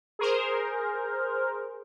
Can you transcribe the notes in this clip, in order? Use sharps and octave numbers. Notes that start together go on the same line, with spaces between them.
G#4 A#4 C5